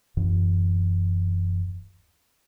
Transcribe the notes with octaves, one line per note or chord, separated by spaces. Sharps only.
D1 F#2 E3